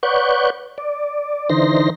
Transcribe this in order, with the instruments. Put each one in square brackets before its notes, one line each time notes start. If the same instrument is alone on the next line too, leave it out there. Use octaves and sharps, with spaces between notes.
[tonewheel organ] B4 C#5 D5 F#5 C#6 G6
D5
D3 E3 D#4 C5 C6 A#6